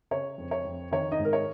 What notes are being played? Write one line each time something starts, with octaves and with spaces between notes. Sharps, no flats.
C#3 C#5
F2
C#5
F2
D#3 C#5
D#4 D#5
G#2
A#4
C#5